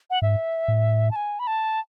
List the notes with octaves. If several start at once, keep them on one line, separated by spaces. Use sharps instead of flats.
F#5
G#2 E5
A2
A5
G#5
B5
A5